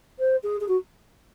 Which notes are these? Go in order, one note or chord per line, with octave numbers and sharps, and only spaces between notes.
C5
G#4
G#4
F#4